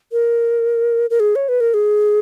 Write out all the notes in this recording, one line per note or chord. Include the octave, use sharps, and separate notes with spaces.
A#4
A#4
G#4
C#5
B4
A#4
G#4